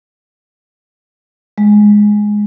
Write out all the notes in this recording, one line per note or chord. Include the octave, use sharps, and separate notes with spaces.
G#3